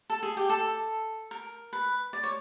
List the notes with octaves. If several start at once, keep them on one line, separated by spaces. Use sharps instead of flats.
A4
G#4
G4
A4
A#4
B4
D5
C#5